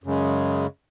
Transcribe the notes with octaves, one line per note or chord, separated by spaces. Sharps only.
F#2 C#3 G#3